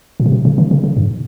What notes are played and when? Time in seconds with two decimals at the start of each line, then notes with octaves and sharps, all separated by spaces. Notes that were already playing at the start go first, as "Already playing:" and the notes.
0.20 A#2
0.26 C3
0.32 B2
0.45 C#3
0.58 D#3
0.71 C#3
0.84 C#3
0.97 G2